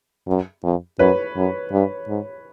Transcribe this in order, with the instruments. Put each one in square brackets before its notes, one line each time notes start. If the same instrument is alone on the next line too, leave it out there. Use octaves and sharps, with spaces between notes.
[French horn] F#2
F2
[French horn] F#2 [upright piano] B4 C#5
[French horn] F#2
G2
G#2